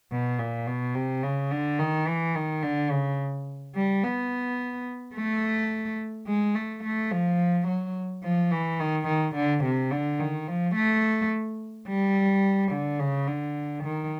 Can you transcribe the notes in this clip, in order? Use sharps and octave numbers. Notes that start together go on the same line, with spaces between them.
B2
A#2
B2
C3
C#3
D3
D#3
E3
D#3
D3
C#3
G3
B3
A3
G#3
A3
A3
F3
F#3
F3
E3
D#3
D#3
D3
C3
D3
D#3
F3
A3
G3
D3
C#3
D3
D#3